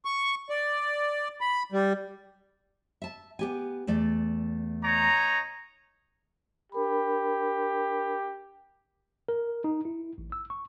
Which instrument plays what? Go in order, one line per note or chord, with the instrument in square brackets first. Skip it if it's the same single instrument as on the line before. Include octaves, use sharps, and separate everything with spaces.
[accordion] C#6
D5
B5
G3
[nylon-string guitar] E5 A5
B3 G4 G#5
E2 A3 D5
[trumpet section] D#4 C#5 A#5
[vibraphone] D4 A#4 B5 [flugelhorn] G4
[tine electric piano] A#4
D#4
E4
A1
E6
C#6